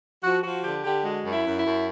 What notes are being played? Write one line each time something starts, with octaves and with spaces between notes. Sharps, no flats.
F3 F#4
F3 F#4
D3 G4
D3 G4
G#3 F#4
F#2
E4
F#2
E4
F#2